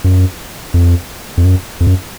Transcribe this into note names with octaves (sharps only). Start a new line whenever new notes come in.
F#2
F2
F2
F#2
F2
F#2